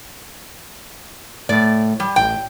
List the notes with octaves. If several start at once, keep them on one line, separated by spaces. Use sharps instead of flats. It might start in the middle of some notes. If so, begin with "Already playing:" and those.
A2 D5
G3
A1 G5